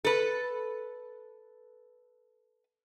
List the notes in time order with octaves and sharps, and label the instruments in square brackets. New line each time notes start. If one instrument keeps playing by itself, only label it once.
[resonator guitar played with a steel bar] A4 B4